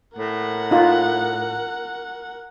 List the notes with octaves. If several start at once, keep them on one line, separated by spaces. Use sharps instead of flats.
A2 A#4 F#5
D#4 F4